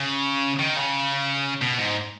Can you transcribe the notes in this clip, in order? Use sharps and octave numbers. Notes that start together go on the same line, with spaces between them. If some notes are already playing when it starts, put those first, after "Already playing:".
Already playing: C#3
D#3
C#3
B2
G#2